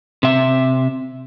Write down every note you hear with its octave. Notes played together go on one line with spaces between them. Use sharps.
C3 E5